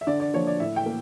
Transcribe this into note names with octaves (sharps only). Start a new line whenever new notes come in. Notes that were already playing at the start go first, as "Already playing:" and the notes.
E5
D3 D5
D5
F3 A#3 C#5
D5
A2 E5
G5
A#3